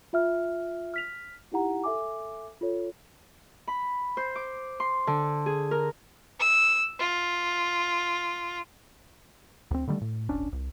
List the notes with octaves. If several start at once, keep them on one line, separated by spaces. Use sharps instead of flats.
F4 E5 F6
F6 B6 F7
D#4 E4 G4 F#5 A#5
A4 E5 G#5 D6
F4 A4 C#5
B5
C5
D6
C6
D3
G#4
A#4
E6
F4
D2 C4
D3 D#3 G3 A3
A2
D1 G1 C#4 D4
C2